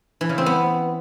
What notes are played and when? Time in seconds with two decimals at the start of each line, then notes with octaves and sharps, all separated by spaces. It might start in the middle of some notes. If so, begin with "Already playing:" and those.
0.21 E3
0.29 C#3
0.38 C4
0.46 B3